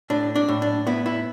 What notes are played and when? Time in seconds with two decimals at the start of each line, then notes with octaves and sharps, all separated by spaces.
0.10 A2 D4
0.35 D4
0.48 A2
0.62 D4
0.87 B3 E4
1.06 E4